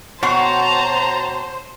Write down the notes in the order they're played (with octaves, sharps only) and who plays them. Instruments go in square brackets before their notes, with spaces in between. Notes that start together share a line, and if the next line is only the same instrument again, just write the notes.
[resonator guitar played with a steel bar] B2 F#4 [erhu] C5 [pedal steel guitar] C#5 G5 C6 [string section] A5 A#5